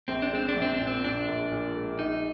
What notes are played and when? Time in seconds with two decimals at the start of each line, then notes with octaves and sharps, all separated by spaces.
0.08 A#1 C4
0.22 D4
0.33 G#3 C4
0.49 D4
0.56 A#1
0.62 C4
0.74 D4
0.80 A#2
0.87 C4
1.04 A#2 D4
1.28 A#1
1.51 A#2
1.76 G#3
1.99 A#1 D#4